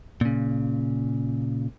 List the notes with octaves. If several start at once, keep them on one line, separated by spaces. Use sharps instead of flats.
A#2 C#3